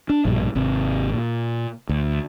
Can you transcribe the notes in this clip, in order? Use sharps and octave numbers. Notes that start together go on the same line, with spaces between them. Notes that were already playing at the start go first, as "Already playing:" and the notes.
D4
A#1 G2 B2
G#1 C3
A#2
D2